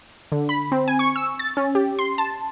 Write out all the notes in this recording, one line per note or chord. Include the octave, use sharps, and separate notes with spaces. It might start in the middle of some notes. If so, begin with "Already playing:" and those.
D3
B5
C4
G#5
C#6
E6
A6
C#4
G4
C6
A5